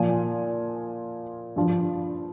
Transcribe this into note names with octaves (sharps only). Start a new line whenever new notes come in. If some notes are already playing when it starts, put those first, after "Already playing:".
Already playing: A#2 F3 G#5
G2 F3